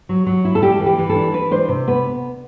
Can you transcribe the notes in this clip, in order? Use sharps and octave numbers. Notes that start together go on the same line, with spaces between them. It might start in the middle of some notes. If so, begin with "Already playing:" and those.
F#3
F#3
E4
A4
G3 G4
E3
G4
E3
A4
D4
E3 B4
D4 C5
C3
B3 B4